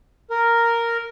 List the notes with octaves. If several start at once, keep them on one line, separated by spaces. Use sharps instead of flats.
A#4